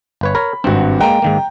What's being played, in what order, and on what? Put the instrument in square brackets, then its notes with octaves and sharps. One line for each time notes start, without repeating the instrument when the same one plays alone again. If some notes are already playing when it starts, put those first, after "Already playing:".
[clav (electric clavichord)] G1 B4 C#5
[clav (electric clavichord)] A#4 C#5 [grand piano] B5
[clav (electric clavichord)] G#1 C4 [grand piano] G2 F#4
[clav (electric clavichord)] G#3 A#3 [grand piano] G5 A#5
[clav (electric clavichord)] G#2 D#3 A#3